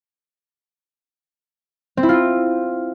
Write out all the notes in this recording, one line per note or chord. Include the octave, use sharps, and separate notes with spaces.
C4
E4
F4